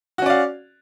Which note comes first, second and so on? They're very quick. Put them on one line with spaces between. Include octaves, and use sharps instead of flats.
F#4 C#4 D5 F5